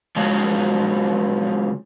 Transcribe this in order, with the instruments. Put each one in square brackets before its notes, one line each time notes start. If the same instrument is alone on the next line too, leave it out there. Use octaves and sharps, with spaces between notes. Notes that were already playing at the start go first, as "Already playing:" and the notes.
[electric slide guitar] C#3 F3 F#3 G#3